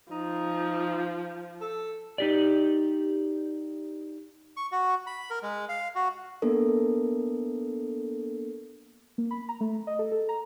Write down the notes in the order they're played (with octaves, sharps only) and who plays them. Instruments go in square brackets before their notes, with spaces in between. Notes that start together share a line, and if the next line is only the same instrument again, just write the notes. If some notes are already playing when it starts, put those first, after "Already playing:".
[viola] F3 [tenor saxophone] D#4
[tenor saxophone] A4
[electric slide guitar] D#4 G4 D5
[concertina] C#6
F#4
B5
A#4
G#3
F5
F#4
[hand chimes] A#3 B3 D4 A4 A#4
[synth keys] A#3
B5
A#5
A3
D#5
A4
A4
A#5